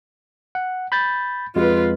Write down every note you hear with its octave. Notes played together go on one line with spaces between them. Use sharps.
F#5
B5 G6 A6
F2 G#3 F4 B4